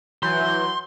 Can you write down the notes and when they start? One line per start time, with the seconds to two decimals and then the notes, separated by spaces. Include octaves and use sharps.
0.23 E3 F#3 C6 G6